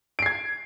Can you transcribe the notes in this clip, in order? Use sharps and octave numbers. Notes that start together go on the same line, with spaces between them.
G#6 C7 D7